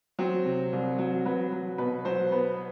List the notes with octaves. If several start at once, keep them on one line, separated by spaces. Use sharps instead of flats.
F#3 C4
C3
C2
F#3
F#3 B4
F#3
B2 B4
F#3 C5
B3 B4